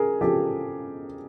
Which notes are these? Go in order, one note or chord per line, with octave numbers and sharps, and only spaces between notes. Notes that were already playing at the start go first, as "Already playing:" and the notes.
Already playing: C#3 G#4 A#4
C#3 F3 G4 A4